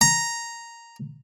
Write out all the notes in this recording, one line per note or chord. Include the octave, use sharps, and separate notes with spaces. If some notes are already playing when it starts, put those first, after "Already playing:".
A#5